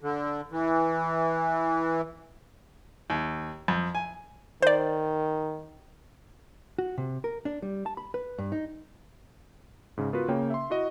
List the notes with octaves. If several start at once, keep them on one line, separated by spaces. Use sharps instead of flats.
D3
E3
D#2
F2
G#5
D#3 C5 D5
F#4
C3
A#4
D4
G3
A5
B5
B4
G2
D#4
G#2 C#3
B3 F4 F#4 A#4 B4
C#3 A#3 C#5 G5
E5 C6
E4 F#4 D#5